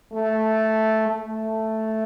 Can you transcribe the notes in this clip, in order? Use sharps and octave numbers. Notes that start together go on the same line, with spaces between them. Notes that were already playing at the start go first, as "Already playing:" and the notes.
A3
A3